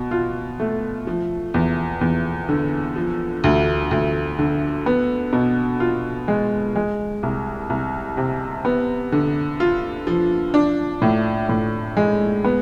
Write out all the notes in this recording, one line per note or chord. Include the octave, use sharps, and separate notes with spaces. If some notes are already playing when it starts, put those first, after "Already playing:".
Already playing: B2
F4
A3
F3
E2
E2
D3
F3
D2
D2
D3
B3
B2
F4
G#3
G#3
C2
C2
C3
B3
D3
F4
F3
D4
A2
A2
G#3
B3